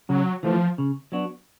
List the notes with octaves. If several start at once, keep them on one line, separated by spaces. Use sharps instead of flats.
C#3 F#3
E3 F3 A3
C#3
F#3 B3 D4 F#4